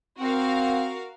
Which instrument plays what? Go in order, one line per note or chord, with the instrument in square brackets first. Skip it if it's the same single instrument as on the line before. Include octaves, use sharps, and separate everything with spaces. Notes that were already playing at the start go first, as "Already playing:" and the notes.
[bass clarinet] C4 [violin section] F#4 A#4 F5